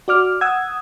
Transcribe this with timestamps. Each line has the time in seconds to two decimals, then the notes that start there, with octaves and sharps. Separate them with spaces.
0.08 F#4 D5 D6 F6
0.41 F#5 D#6 E6 G#6